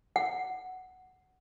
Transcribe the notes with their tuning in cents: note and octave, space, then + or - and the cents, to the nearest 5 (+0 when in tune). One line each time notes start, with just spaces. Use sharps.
F#5 +5